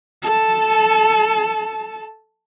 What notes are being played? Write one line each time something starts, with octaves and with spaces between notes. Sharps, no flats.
A4 A5